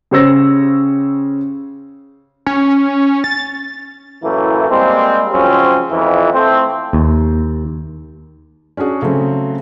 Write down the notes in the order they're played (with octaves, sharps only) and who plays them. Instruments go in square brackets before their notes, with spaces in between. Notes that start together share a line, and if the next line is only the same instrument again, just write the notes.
[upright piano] C#3 G4 C5 C#5 E6 A#6
[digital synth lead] C#4
A6
[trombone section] F#2 A2 E3 A3 A#3 E4
G3 G#3 A#3 C4
C#3 F3 F#3 G#3 C4 C#4
F2 E3
A3 C4
[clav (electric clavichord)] D#2
[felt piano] C#4 D4 F#4 G#4
C#3 F#3 A3 C4